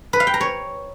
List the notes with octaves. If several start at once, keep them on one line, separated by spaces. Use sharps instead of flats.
B4
F5
G5
A#5
C#5